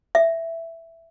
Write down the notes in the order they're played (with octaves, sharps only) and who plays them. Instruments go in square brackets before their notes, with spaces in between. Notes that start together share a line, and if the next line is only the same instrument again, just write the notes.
[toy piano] E5